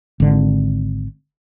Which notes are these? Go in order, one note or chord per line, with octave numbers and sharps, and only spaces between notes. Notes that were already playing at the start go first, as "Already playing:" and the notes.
G#1 D3